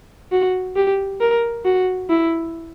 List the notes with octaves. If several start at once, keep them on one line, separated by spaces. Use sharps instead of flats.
F#4
G4
A#4
F#4
E4